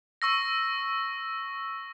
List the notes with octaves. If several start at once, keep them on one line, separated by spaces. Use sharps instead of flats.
C#6 E6 A#6